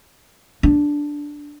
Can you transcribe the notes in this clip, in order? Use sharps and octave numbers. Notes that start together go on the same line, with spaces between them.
D4